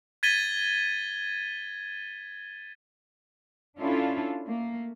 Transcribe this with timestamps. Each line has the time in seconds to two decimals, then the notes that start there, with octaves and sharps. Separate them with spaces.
0.23 G#6 A6 B6 D#7 G7
3.78 C#4 D4 E4 F4 A4
4.47 A3 A#3